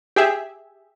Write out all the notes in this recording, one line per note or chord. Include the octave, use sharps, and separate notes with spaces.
G4 G#4 E5